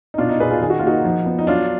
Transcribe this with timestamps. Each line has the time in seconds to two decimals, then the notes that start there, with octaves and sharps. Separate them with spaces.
0.14 D#4
0.18 B2 D4 F4
0.29 D#4
0.40 B2 G#4 B4
0.50 F4 G#4
0.62 D#3 G#4
0.70 F#4
0.79 F4
0.83 A#3 D#4 F#4
1.04 F3
1.26 B3
1.39 D#4
1.47 F#3 D4 F4